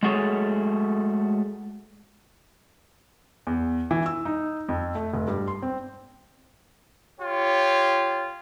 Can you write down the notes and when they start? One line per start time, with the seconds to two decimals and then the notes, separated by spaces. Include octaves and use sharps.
0.03 G#3 A3 F#4 G#4 A4 C#5
3.47 E2
3.91 E3
4.06 E6
4.25 D#4
4.69 F2
4.95 A3
5.14 F1
5.28 G2
5.48 C6
5.62 C4
7.20 F4 G4 C#5